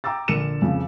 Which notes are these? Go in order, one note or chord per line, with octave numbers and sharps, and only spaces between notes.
G5 A#5 D6 E6 A6
A#1 D3 A#4 C#7 E7
F2 C#3 F3